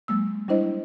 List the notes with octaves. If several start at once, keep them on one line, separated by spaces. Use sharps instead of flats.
F#3 G#3 A#3 E6
G3 D4 E4 C5 D#5